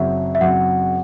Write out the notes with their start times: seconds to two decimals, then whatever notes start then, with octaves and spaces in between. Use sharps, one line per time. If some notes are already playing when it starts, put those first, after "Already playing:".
Already playing: F#1 F#2 F#3 C4 F#4 E5
0.35 E5
0.41 F#1 F#2 F#3 C4 F#4 F#5